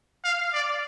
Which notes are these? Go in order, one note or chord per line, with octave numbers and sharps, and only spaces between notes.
F5
D5